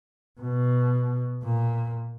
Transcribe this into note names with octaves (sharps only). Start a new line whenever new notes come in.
B2
A#2